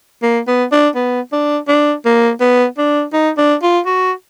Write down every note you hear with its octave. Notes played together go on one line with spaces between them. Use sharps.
A#3
B3
D4
B3
D4
D4
A#3
B3
D4
D#4
D4
F4
F#4